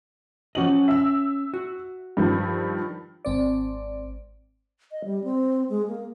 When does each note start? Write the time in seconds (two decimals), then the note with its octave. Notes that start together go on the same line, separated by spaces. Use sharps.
0.55 F3 C#4 F#4 D#5 F#7
0.88 E5 E6
1.54 F#4
2.17 G2 D#3 F3
3.25 G#1 C4 D5
4.92 D#5
5.05 G3
5.24 C4
5.70 G#3
5.88 A#3